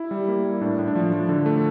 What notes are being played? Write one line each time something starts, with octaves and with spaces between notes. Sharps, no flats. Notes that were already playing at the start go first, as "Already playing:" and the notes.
Already playing: E4
G3
A#3
G3
A2 D4
A2
D4
F3
F3
D3
A3